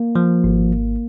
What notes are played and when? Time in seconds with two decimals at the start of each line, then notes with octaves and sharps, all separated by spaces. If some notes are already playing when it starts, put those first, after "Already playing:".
Already playing: A#3
0.16 F3
0.44 G#1